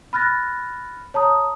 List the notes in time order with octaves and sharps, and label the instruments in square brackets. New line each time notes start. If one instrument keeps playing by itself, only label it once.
[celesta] B5 F6 F#6 A6 A#6
C#5 A5 A#5 D#6